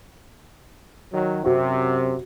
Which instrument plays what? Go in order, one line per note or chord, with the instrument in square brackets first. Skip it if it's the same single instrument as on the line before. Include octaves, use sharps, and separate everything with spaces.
[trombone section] D#3 F#3
[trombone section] F#2 C3 [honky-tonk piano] F#4